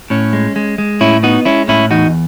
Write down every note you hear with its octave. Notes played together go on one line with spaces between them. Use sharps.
A2 C#4
G#3
G#3
G#3
A2 C#4 E4
B3 D#4 F#4
G#3 C#4 E4
A2 C#4 E4
E2 D#4 F#4